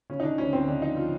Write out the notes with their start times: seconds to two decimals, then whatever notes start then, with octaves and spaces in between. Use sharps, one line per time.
0.10 C#3 C#4
0.20 D#4
0.24 C#3 D4
0.38 D2 C#4
0.53 D2 C4
0.67 C#3 D4
0.82 F3 D#4
0.97 F3 F4